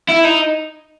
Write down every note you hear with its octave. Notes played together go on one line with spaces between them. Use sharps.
E4
D#4